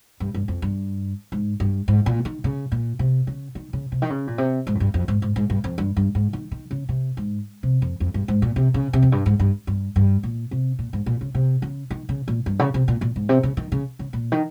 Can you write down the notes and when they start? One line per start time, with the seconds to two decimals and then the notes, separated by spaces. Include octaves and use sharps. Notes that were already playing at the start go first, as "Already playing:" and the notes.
0.20 G2
0.34 G2
0.48 F2
0.62 G2
1.32 G#2
1.60 G2
1.88 G#2
2.06 A#2
2.25 D#3
2.44 C#3
2.72 A#2
2.99 C3
3.27 C#3
3.55 D#3
3.73 C#3
3.92 C3
4.02 D#3
4.10 C#3
4.27 A#2
4.38 C3
4.67 G#2
4.75 F2
4.80 G2
4.94 F2
5.08 G#2
5.22 G#2
5.36 G#2
5.50 G2
5.64 F2
5.78 G2
5.97 G2
6.15 G#2
6.33 D#3
6.51 D#3
6.71 C#3
6.89 C3
7.17 G#2
7.63 C3
7.82 F2
8.00 F2
8.14 G2
8.28 G#2
8.42 A#2
8.56 C3
8.74 C#3
8.93 C3
9.02 F2
9.12 G2
9.26 G#2
9.39 G2
9.67 G2
9.96 G2
10.23 A#2
10.51 C3
10.79 A#2
10.93 G#2
11.06 A#2
11.21 C#3
11.35 C3
11.62 C#3
11.91 D#3
12.09 C#3
12.28 A#2
12.46 G2
12.59 C#3
12.74 C3
12.88 A#2
13.01 A#2
13.16 G#2
13.29 C3
13.43 C#3
13.57 D#3
13.72 C#3
13.99 C#3
14.13 A#2
14.32 D#3